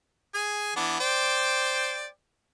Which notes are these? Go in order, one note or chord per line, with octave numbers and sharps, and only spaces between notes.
G#4 G#5
E3 B3 D4
C5 D5 G5